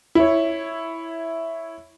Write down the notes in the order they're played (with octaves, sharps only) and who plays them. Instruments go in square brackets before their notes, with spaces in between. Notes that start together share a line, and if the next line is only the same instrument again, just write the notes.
[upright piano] E4 C#5